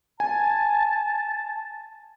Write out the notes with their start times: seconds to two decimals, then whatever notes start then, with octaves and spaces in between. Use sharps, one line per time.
0.20 G#5 A5